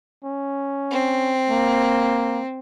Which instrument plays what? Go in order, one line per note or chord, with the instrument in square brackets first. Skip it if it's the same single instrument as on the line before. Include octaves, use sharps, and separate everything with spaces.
[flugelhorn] C#4
[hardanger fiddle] C4
[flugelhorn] A#3